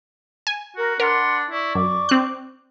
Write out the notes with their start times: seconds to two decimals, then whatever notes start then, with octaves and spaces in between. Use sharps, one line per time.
0.47 G#5
0.76 F#4 A#4
1.00 D4 A#4 F#5 B5 C6
1.51 E4 D5 C#6
1.75 F#2 D6
2.09 C4 F#6